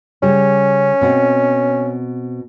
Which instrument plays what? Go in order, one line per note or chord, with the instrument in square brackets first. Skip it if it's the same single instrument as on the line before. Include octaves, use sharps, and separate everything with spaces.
[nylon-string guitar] C#3 G3 [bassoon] C#4
[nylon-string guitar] B2 C4